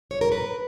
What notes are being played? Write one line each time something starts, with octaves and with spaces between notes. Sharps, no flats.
C#5
A#4
B4